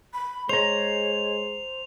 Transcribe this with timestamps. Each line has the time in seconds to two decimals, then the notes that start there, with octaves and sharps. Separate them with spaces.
0.13 B5
0.49 G#3 C5 C#5 A#5 F7